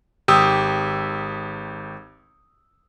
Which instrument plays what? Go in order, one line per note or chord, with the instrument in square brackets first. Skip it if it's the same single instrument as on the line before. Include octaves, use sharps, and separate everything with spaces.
[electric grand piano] G#1 G4 D#6 E6